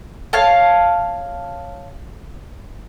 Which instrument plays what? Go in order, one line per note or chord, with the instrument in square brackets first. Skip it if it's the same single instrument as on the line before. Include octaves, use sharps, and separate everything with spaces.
[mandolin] C#5 F5 A5